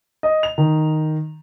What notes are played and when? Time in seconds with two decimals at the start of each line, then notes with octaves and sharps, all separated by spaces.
0.23 D#5
0.43 F7
0.58 D#3